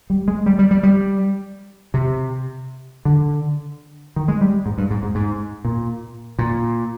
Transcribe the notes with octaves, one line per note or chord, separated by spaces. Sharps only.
G3
G#3
G3
G3
G3
G3
C3
D3
D#3
G#3
G3
G#2
G2
G#2
G#2
G#2
A#2
A#2